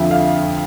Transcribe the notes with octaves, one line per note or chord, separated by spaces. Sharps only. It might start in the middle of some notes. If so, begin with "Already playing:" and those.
Already playing: F2 D3 F3 E5
F5